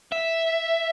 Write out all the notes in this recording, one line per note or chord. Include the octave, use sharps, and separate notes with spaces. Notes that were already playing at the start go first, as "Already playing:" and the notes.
E5